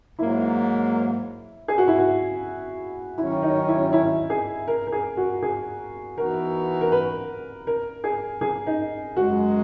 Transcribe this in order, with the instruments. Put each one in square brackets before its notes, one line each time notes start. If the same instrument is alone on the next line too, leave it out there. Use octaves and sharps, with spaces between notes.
[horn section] G#2 F#3 A#3 [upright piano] E4
[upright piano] G#4
F#4
E4
F#4
[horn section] D#3 F#3 C#4 [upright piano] E4
[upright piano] D#4
E4
E4
G#4
A#4
A#4
G#4
F#4
G#4
[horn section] E3 B3 D#4 F#4 [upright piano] A#4
[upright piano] A#4
B4
A#4
G#4
G#4
D#4
[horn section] F#2 C#3 G#3 [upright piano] F#4